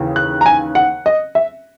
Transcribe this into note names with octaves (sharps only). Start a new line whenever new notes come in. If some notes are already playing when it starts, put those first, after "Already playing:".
Already playing: D#2 C#3 E3
F#6
A#5
G#5
F#5
D#5
E5